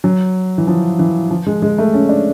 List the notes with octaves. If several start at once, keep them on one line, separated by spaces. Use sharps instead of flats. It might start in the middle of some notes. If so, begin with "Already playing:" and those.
F#3
E3
F3
E3
F3
G#3
G#3
A3
C#4
D4